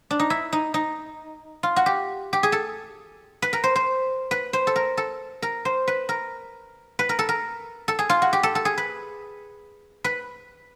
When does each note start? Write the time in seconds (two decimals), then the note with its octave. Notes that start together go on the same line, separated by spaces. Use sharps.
0.11 D4
0.19 D#4
0.30 E4
0.53 D#4
0.74 D#4
1.63 F4
1.76 F#4
1.86 G4
2.33 G4
2.43 G#4
2.52 A4
3.42 B4
3.53 A#4
3.64 C5
3.76 C5
4.31 B4
4.53 C5
4.67 A4
4.76 A#4
4.97 A4
5.42 A#4
5.65 C5
5.87 B4
6.09 A#4
6.99 B4
7.09 A#4
7.19 A4
7.29 A#4
7.88 A4
7.99 G#4
8.09 F4
8.22 F#4
8.33 G4
8.43 A4
8.55 A4
8.65 G#4
8.78 B4
10.04 B4